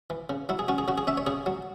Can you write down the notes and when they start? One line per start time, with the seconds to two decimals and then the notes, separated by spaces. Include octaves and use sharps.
0.10 E3
0.30 C#3
0.49 F#3 E4
0.59 G#4
0.68 C#4 F#4
0.78 G#4
0.88 C#3 F#4
0.98 G#4
1.07 C#4 E5
1.17 C#5
1.26 C#3 G#4
1.46 F#3